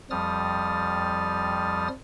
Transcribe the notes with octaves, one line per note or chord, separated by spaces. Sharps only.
F2 F3 G3 D#6 F6 A6